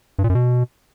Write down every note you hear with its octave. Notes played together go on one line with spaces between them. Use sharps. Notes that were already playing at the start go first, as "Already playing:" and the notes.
G2
A#2
F#2
B2